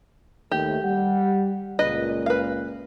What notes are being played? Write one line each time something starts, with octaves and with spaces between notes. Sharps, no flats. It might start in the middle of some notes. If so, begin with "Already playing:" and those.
D#2 A3 G4
G3 F#5
C#2 A#2 B4 D#5
B4 F5